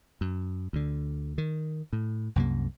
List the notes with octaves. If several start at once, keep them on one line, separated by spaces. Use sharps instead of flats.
F#2
D2 D3
D#3
A2
C2 F#2 C3 A#3